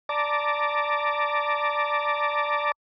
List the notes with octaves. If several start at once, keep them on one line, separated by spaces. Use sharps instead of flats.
D5 A5 A#5 D6